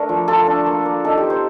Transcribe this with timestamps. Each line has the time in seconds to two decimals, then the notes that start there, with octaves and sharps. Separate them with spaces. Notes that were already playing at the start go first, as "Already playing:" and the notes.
Already playing: A3 D4 A#4
0.09 F3
0.28 F4 A4
0.47 D4
0.66 A#3
0.85 A#3
1.05 D#4 A4
1.17 G4
1.24 C4
1.30 C5